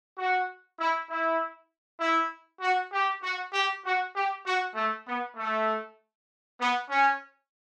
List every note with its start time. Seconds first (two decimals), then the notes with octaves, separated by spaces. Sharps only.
0.17 F#4
0.79 E4
1.08 E4
2.00 E4
2.61 F#4
2.92 G4
3.22 F#4
3.53 G4
3.83 F#4
4.14 G4
4.45 F#4
4.74 A3
5.06 B3
5.35 A3
6.58 B3
6.88 C#4